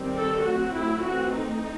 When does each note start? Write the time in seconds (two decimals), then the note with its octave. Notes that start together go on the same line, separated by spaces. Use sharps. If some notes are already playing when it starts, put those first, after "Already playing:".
Already playing: D#3 G3 C4
0.17 A4
0.45 F#3 A3 C4 F#4
0.74 E4
1.02 E3 A3 C4 F#4
1.30 D#4